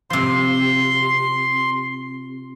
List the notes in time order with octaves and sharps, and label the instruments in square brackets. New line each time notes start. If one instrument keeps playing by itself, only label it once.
[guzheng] C3 F3 [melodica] C6